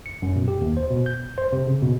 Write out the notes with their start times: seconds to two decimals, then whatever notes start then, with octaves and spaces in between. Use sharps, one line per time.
0.06 C#7
0.22 F#2
0.36 B2
0.48 G4
0.61 D#2
0.77 C5
0.90 B2
1.06 G6
1.38 C5
1.53 C3
1.67 C#3
1.82 B2